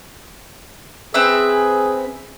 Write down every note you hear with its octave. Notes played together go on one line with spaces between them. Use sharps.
C4 G#4 B4 E5